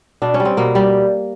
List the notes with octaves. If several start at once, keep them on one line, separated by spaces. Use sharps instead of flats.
B2 D4
C#4
G3
C4
B2 A#3
G3